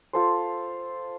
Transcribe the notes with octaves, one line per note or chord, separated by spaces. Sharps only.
F4 A4 C5